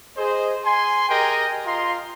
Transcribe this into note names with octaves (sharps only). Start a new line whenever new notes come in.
G#4 C5 D#5
G#5 C6
G4 G#4 A#4 D#5 G5 G#5
F4 D#5 A#5 C6